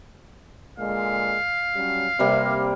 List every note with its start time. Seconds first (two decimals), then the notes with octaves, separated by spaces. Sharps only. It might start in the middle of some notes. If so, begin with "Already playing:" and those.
0.78 A#2 D3 G#3 F5
1.76 F#3 G3 C#4
2.19 C3 G3 A#3 C4